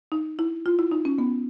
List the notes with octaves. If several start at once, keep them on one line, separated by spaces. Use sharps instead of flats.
D#4
E4
F4
E4
D#4
C#4
B3